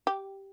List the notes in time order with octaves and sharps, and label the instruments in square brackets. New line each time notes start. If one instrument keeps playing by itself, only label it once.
[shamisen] G4